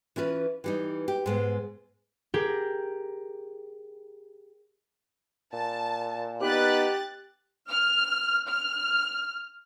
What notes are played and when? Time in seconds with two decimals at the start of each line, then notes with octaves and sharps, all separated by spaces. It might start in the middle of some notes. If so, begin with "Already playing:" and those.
0.16 E3 C#4 F4 B4
0.64 E3 G3 D#4
1.08 G4
1.26 G#2 G#3 B3
2.34 G4 G#4 A#4 G5
5.53 A#2 A5
6.41 B3 D#4 G4 B4 F#6 A6
7.70 F6
8.48 F6